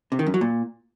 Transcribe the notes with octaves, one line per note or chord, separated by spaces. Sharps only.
C3
D#3
F#2
F#3
A#2